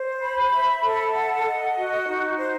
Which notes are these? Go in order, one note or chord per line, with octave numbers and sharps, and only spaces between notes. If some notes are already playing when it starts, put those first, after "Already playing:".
Already playing: C5
B5
E5
A4
F#5
D#5
F#4
D#4
C5